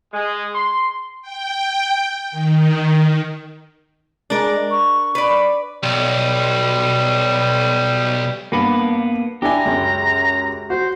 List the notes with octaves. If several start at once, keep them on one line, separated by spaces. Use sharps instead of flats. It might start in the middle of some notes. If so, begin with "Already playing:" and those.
G#3
C6
G5
D#3
G#3 D4 A#4
C#6
B4 D5
B1 G3
G2 A#3 B3 B4
D4 E4 G4 G#5 A#5
C#2 F#2
F#4 C5